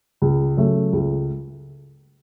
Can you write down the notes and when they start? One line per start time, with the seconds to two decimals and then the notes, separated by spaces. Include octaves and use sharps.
0.22 C#2
0.57 C#3 F#3 A3
0.93 C#2